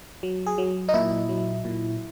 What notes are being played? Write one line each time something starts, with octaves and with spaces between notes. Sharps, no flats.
F#3
G#4
F#3
D#4
A#2 E4
F#3
A#2